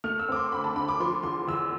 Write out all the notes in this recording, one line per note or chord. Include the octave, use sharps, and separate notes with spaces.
A3 F6
E6
C4 D6
C6
D2 B5
A5
D3 B5
D6
F3 C6
E2 C6
E2 E6